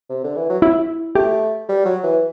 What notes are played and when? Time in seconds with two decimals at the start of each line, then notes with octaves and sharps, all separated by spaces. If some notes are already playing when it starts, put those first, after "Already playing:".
0.09 C3
0.24 D3
0.36 E3
0.49 F#3
0.62 E4
1.15 A3 G4
1.69 G3
1.85 F#3
2.03 E3